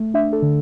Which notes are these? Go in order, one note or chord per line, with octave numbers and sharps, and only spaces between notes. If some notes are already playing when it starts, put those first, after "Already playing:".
Already playing: A3
D4 E5
A4
D3